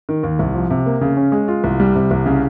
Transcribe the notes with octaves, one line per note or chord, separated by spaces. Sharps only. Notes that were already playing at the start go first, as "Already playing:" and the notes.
D#3
D#2
C2
F3
C3
A#3
C#3
C#4
G#3
F4
C2
G3
C3
C2
C#3